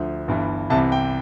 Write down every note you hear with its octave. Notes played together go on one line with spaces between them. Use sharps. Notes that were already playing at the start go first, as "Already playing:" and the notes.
Already playing: D2 D3 F3
G1 G2 E3
C2 C3 E3 A5
G5